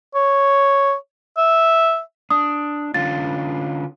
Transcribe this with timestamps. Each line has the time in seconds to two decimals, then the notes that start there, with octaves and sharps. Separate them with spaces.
0.15 C#5
1.38 E5
2.31 D4 D#6
2.94 D3 C#4 F4 A6